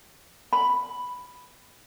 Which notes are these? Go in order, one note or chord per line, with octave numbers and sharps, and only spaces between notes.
B5